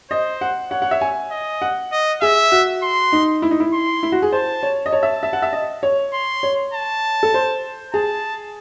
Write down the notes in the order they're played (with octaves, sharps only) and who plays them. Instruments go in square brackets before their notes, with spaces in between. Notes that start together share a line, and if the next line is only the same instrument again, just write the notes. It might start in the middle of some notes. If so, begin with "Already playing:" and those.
[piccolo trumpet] C5 [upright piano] D#5
[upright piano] F#5
[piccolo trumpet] C#5 [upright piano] F#5
[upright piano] F#5
E5
G#5
[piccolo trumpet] D#5
[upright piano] F#5
[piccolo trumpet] D#5
[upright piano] G#4 [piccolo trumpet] E5
[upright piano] F#4
[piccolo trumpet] C6
[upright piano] D#4
E4
D#4
E4
[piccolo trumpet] C6
[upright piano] E4
F#4
G#4
[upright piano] C5 [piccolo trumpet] A5
[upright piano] C#5
D#5
[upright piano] C#5 [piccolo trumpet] A5
[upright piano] E5
E5
F#5
E5
D#5
C#5
[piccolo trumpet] C6
[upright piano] C#5
[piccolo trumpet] A5
[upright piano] A4
C5
[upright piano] G#4 [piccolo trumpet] A5